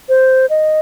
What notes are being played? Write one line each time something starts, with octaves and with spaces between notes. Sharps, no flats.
C5
D#5